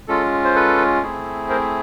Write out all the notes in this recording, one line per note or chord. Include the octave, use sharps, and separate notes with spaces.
G#3 C#4 F4 A4
C5
A4 B4
A3 C4 E4 G#4
A#4 C5